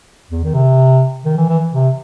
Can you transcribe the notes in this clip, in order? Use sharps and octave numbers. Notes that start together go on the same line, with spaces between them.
E2
D#3
C3
D#3
E3
E3
C3